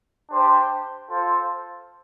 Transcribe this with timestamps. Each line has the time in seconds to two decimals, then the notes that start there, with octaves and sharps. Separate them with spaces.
0.30 D4 G4 C5 G5
1.09 F4 A4 C5